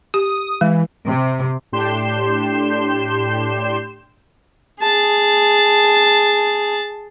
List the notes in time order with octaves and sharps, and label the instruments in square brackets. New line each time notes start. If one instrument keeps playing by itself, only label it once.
[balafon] G4 [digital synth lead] D#6
[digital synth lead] D#6
[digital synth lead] E3 [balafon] G#3
[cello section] C3
[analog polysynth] A2 D4 G4 C6 G6 E7
[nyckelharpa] G#4 A5